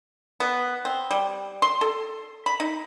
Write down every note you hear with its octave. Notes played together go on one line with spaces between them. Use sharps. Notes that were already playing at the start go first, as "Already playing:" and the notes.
B3
C4
G3
C6
A4
B5
D#4